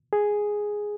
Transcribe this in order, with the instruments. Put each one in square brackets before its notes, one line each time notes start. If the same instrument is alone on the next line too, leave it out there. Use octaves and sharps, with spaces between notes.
[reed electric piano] G#4